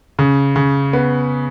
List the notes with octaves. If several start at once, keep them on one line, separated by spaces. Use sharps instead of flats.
C#3
C#3
B3